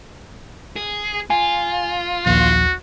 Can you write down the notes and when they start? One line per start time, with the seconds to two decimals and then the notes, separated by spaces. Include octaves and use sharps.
0.76 G#4
1.30 F4 G#5
2.26 A#1 D#2 F#4